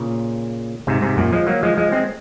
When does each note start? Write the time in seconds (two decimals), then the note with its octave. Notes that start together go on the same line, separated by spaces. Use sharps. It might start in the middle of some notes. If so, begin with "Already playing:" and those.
Already playing: A#2 C#3
0.87 G#2 C3
1.02 G#2 C3
1.17 F#2 A#2
1.32 F3 G#3
1.47 F#3 A#3
1.63 F3 G#3
1.77 F3 G#3
1.92 G#3 C4